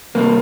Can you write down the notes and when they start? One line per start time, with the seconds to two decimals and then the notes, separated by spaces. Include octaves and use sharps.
0.15 C2 C3 G3 A#3